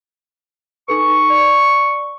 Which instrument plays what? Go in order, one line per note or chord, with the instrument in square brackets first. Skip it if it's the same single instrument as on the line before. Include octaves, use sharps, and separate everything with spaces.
[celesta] D#4 A4 B4 [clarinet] C#6
[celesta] D5 C#7